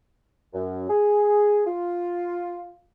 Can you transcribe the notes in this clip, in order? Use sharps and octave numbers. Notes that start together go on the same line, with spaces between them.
F#2
G#4
F4